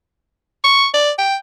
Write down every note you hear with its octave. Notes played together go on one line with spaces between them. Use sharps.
C#6
D5
G5